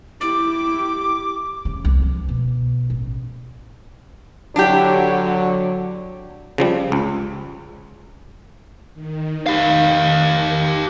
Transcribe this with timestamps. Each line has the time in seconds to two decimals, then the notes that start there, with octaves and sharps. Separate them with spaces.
0.21 E4 G4 D6
1.65 C#3
1.85 C2
2.02 F3
2.28 B2
2.90 A1
4.56 D3 F#3 D4 E4 G4
6.58 C#3 F3 G3
6.92 C#2
8.94 D#3
9.47 G4 F5